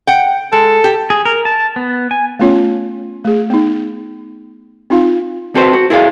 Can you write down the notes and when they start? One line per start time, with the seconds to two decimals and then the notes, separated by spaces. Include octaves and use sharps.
0.07 F#5 G5
0.53 G#3 A4
0.84 G4
1.10 G#4
1.25 A#4
1.45 A5
1.76 B3
2.11 G#5
2.39 A3 B3 C#4 F4 C#5
3.24 A3 G#4
3.50 B3 D#4
4.90 C4 D#4 F4 F5
5.55 C4 F#4 A4 B4 C5
5.73 F#4
5.90 E4 G#4 A4 E5 F5